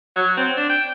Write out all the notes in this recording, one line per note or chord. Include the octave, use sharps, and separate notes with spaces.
F#3
C4
D4
G5